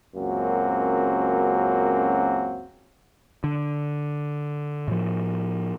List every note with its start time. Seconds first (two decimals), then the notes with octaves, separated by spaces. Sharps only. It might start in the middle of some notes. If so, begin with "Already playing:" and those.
0.16 C#2 F#2 A#3 C4 F#4
3.44 D3
4.88 A2 F3